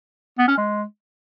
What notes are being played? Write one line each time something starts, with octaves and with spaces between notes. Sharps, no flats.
B3
C#4
G#3